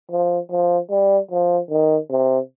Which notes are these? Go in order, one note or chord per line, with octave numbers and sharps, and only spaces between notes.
F3
F3
G3
F3
D#3
C3